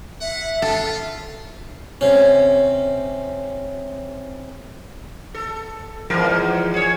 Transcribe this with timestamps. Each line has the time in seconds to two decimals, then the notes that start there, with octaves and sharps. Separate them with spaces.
0.21 E5 F#5
0.62 F4 A4
2.01 C3 C#4
5.35 A4
6.10 E2 G#2 F3 A#4
6.74 G#4 C#5